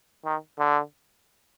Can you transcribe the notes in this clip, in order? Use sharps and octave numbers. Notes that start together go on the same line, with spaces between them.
D#3
D3